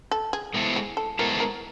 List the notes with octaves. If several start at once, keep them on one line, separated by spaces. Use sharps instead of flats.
A4
G#4
G#3 B3 E4 A4 C5
G#4
A4
G#3 B3 E4 A4 A#4 C5
A#4